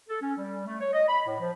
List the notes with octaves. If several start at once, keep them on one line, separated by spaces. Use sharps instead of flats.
A4
C#4
G3
A3
C#5
D#5
B5
A2
F3